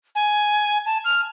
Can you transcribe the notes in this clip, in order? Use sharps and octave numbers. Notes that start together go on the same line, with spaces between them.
G#5
A5
F6